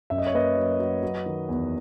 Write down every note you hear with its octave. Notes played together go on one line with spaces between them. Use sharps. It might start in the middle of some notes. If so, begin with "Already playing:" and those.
F#2 E5
D#5
C#5
A#3 B4 D#5
F#3
F#3
F#3
D#3
E2